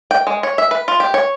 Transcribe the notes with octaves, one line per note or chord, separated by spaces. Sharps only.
G5
G#3
C#5
E5
B4
F4
G4
C#5